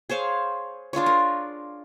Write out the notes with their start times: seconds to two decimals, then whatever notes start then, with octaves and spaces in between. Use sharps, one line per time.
0.09 G#4 C5 C#5 F5
0.93 D4 F4 G#4 C#5
1.06 A#4